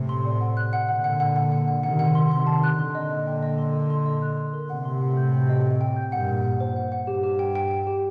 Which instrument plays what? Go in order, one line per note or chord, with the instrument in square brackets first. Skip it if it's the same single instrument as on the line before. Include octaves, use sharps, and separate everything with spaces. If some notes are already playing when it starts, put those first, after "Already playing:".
Already playing: [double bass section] A2 C3
[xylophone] C6
D5
F#5
F#6
F#5
[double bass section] A#2 D3 [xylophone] F#5
[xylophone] F#5
F#5
F#5
F#5
F#5
[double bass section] C3 D#3 [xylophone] F#5
[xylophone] F#5
C6
[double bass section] C3 D#3 [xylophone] C6
[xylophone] A5
F#6
[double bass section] A#2 D3 [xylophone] C6
[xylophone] D#5
D#5
G5
D#5
C6
D#5
C6
D#5
F#6
C6
A#4
[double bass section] A2 C3 [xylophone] F#5
[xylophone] C6
F#5
G6
G5
D#5
G5
G5
G6
[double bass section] G2 A#2 [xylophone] F#5
[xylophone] F#5
F#5
C5
F#5
F#5
[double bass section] G2 [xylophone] G4
[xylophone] G4
G5
G5
G5
G4